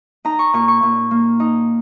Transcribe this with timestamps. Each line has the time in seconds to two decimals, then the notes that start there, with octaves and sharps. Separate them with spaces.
0.25 D#4 A#5
0.39 C#6
0.53 A#2 C#6
0.68 C#6
0.83 A#2
1.11 A#3
1.40 D#4